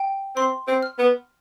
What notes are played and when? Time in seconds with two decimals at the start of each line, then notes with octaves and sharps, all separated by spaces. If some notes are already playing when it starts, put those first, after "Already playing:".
Already playing: G5
0.36 C4 C6
0.68 C4
0.83 F6
0.99 B3